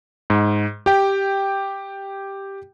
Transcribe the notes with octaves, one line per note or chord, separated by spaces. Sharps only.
G#2
G4 G5